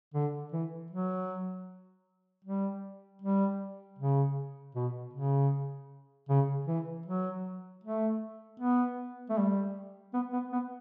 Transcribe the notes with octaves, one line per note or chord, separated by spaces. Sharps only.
D3
E3
F#3
G3
G3
C#3
B2
C#3
C#3
E3
F#3
A3
B3
A3
G3
B3
B3
B3